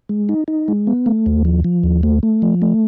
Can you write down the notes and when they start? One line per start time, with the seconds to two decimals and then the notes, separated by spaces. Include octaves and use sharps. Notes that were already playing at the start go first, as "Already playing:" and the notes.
0.09 G#3
0.29 D#4
0.48 D#4
0.68 G#3
0.87 B3
1.06 A3
1.26 D#2
1.45 F3
1.64 F3
1.83 D#2
2.03 A3
2.23 A3
2.42 F3
2.62 A3